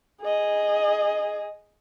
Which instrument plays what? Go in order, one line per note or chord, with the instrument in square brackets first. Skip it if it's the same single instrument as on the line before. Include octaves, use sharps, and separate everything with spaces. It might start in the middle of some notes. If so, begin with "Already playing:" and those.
[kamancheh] G#4 D#5